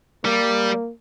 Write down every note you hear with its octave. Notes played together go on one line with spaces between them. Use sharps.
G3 A#3